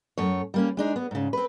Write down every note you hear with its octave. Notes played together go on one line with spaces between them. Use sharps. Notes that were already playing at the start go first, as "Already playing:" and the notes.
F#2 A3 C#5
G3 A#3 C#4
G#3 D4 D#4
B3
G#2 C#3
C4 B4